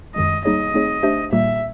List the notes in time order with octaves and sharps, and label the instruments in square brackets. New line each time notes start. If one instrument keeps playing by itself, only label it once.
[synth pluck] F#2 D#3 G#3 [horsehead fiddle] D#5
[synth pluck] G3 A#3 D#4 G#4 C#5 [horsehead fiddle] D#5
[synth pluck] A3 C4 D#4 G#4 C#5
A3 D4 G4 C5 E5
[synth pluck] A#2 G3 A#3 [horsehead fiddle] E5